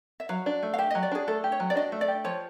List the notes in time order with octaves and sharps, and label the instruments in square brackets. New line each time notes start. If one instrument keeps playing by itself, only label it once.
[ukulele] E5
[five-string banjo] F#3 [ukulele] F5
[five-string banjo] D4
A3
[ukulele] F5
[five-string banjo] G4 [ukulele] E5
[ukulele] D#5
[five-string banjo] F#3
[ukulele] D5
[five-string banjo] D4 [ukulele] G#4
[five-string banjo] A3 [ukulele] A4
[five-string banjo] G4
[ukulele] C#5
[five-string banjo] F#3
[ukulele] D5
[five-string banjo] D4 [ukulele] D#5
[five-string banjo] A3
[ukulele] D5
[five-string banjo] G4
[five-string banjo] F3 [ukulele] C#5